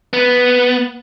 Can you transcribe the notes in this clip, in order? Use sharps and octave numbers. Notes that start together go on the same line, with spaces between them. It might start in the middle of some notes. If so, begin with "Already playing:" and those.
B3